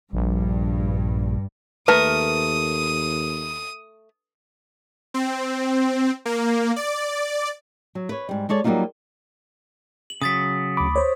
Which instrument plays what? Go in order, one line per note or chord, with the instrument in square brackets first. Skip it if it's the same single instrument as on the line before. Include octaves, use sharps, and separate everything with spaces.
[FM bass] A#1 [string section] G2
[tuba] D#2 [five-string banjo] A3 A#4 [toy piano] B4 [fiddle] D#6
[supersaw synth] C4
A#3
D5
[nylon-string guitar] F#3
B4 C#5
G#2 G3
G#3 A4 C#5 D5
F#3 G3 A3 A#3 D#4 F4
[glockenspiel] F#7
[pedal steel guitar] C#3 F#3 [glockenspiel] D#6 A6 B6
[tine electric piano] D2 B5 [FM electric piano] D6
[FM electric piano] C5 C#5